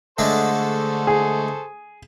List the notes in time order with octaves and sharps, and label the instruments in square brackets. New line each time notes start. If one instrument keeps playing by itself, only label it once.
[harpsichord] D3 G#3 A3 [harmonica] A4 C5 C#6
[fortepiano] G#4